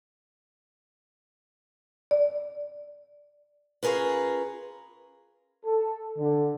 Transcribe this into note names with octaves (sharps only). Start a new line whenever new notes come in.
D5
C#4 F4 G#4 A#4 B4
A4
D3